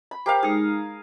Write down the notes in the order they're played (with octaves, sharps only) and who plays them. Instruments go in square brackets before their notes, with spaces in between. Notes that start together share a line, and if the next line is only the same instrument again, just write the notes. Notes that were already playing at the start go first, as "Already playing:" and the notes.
[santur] B5
[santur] G4 A#4 F5 [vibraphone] C5
[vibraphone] G#3 D#4 [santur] G#4